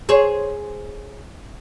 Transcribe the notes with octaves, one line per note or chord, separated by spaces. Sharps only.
G#4 C5 C#5